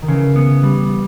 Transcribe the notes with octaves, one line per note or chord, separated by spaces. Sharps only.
D#3
C#3 E3
B3
G3